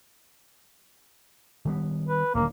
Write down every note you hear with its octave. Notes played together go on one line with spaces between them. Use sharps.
D#3 G3 B3
B4
D#1 D#2 D3 A#3